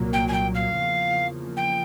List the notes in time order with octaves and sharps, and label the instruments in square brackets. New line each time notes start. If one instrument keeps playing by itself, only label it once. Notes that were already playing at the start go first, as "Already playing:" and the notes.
Already playing: [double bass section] C2 A#2 F#3 A#3
[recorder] G5
G#5
G5
F5
[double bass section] E2 C#3 F3 A#3
[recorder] G5